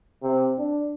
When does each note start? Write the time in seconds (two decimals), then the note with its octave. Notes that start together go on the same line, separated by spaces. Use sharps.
0.22 C3
0.58 D4